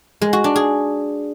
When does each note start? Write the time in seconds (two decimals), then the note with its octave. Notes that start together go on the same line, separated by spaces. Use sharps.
0.21 G#3
0.33 F#4
0.44 D4
0.56 G#4